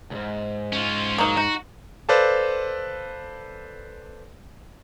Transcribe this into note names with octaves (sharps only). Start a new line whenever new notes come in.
C#2 G#2
C#4 F4
F#3 A#3 D#4 F5
D#4 F#4
A4 B4 C5 D5 F5 A5